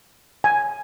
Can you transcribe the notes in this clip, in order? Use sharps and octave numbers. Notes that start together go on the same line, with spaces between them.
G#5